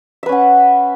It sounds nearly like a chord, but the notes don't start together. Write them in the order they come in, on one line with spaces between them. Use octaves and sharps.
E5 B4 C#4 F#5